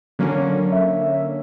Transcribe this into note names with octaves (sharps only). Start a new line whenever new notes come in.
D3 F#3 A#3 C#4
E5